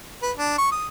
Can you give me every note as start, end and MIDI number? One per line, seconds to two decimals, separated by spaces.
0.22 0.32 71
0.37 0.57 62
0.58 0.67 85
0.72 0.87 87